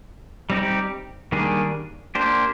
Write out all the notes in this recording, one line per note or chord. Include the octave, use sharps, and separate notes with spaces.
G3 C4 D#4 G4
D#3 G3 A#3 D4 G#4
A#3 D4 G4 C5